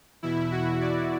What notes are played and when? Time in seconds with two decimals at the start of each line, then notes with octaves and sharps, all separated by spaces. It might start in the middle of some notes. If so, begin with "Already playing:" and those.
0.23 E2 B2 E4
0.51 F#4
0.81 D5